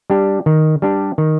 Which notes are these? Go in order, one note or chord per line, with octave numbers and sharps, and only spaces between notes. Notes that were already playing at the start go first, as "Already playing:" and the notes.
G3 D4 G4
D#3
G3 D4 G4
D#3